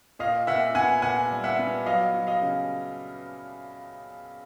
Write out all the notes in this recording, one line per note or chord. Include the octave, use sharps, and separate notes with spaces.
A#2 D#5 F5
A#2 E5 F#5
B3 F#5 G#5
A#2 F#5 G#5
G3
E5 F#5
B3
F#3 D#5 F5
F#3
D#5 F5
C#3